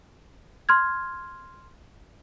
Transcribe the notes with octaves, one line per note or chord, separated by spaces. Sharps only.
C6 F6 G#6